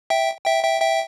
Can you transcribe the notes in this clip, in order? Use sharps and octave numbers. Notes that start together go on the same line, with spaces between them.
E5 G5
E5 G5
E5 G5
E5 G5